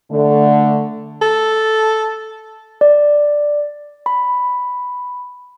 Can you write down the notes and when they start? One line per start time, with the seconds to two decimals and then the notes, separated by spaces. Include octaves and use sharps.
0.11 D3 A3
1.22 A4
2.81 D5
4.06 B5